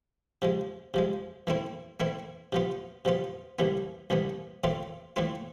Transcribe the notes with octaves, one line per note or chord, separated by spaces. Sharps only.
C3 F3 G#3
C3 F3 G#3
E3 A3 C4 E4
E3 A3 C4 E4
C3 F3 B3 F4
C3 F3 B3 F4
C2 C3 E3 B3
C2 C3 E3 B3
A2 E3 A3 C4 F4
A2 E3 A3 C4 F4